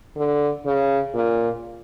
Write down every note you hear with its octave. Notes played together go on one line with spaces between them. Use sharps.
D3
C#3
A#2